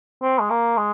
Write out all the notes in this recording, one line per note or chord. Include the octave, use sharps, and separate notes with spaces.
C4
G#3
A#3
G#3